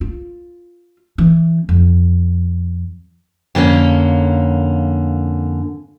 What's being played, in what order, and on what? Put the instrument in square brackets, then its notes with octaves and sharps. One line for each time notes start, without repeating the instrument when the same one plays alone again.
[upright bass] F4
E3
F2
[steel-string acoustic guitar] F2 D3 A#3 C#4